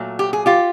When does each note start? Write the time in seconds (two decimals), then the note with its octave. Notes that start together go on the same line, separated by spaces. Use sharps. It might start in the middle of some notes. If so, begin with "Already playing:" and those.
Already playing: A#2 F#3 A3
0.19 G4
0.33 G#4
0.46 F4 G4